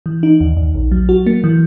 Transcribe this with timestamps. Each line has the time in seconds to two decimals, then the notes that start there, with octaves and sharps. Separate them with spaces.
0.06 E3
0.23 D#4
0.41 D#2
0.57 D#2
0.75 A#1
0.91 F#3
1.09 F#4
1.26 A#3
1.44 E3